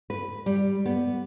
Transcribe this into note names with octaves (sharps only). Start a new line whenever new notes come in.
B4
G3
B3